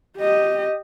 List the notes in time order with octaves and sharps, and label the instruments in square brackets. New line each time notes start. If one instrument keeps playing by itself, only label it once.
[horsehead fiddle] G4 D#5